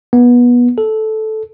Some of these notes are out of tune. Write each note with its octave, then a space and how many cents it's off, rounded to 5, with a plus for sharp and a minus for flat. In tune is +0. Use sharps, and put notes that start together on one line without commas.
B3 -20
A4 -10